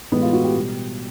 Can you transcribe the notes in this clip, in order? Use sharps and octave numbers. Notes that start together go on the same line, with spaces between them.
A2 E3 G#3 B3
F4
F#4
G4
B2 G3